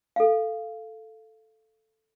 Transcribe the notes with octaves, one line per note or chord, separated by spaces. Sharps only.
A4 F5